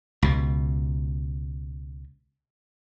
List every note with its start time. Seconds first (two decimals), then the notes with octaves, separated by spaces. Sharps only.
0.22 C#2 B2